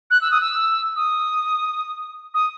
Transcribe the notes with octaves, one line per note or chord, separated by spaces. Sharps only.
F#6
E6
D#6
E6
D#6
D#6